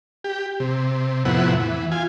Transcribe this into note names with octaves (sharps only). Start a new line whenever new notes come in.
G4
C3
F2 A2 C3 B3 E4 F#5
E3
F4 G#5